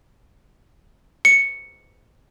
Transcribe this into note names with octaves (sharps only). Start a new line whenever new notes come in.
C#7